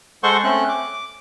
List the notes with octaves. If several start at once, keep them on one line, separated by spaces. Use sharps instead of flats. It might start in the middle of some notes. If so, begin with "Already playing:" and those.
G#3 A4 C5 F#5 C6 C#6
A3 C4 C#4 F#6
D6